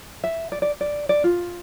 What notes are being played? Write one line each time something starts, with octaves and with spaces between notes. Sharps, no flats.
E5
D5
D5
D5
D5
F4